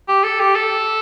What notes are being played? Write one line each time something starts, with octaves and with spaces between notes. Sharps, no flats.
G4
A4
G4
A4